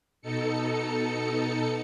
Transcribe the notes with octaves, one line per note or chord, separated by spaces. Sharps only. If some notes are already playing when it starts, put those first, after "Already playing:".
B2 D#4 A4 C#7